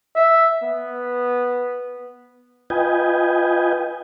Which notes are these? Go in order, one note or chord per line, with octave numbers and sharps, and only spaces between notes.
E5
B3
F4 B4 D#5 G5 G#5